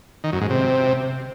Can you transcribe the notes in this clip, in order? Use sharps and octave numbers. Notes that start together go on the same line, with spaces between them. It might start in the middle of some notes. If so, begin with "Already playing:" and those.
D#3
F#2
G#2
C3